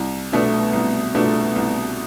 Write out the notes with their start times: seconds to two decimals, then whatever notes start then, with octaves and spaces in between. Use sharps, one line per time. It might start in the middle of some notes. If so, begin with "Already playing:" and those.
Already playing: C2
0.32 B2 A3 D4
0.73 C2
1.15 B2 A3 D4
1.56 C2